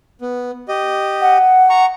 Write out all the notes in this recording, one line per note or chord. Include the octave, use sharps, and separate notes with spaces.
B3
G4 D#5
F#5
A#5 C#6